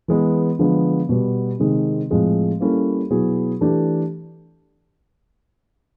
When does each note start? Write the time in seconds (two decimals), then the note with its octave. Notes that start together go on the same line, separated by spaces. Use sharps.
0.08 E3 G#3 B3
0.59 D3 F3 G#3 B3
1.09 B2 G3 B3
1.60 C3 D#3 G#3 C4
2.10 A2 F3 G#3 C4
2.60 G3 A#3 C#4 E4 A4
3.10 B2 F#3 B3 E4 G#4
3.61 E3 A3 D4 G4